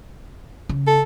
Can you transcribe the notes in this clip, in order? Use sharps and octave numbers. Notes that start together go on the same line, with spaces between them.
C#3
A4